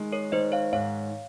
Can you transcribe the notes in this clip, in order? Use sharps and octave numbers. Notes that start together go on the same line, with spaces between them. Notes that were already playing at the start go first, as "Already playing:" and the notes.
Already playing: D#3 G#3
A#4 C#5
D#3 C5 D#5
C#5 F5
G#2 C#5 F5